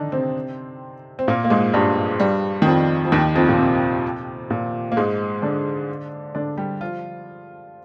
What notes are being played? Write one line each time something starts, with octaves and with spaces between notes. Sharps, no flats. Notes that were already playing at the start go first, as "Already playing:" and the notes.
Already playing: D3 D#3 D4 D#4
C3 C4
C4
A#2 A#3
A#3
G#2 G#3
G2 G3
G2 G3
D#3
F2 F3
F3
D#2 D#3
F2 F3
A#2
C3
A#2
A#3
G#2 G#3
D3 D4
D3 D4
G3 G4
F3 F4